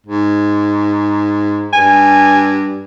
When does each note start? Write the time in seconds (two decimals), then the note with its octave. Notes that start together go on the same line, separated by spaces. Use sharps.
0.07 G#2
1.73 G2 G#5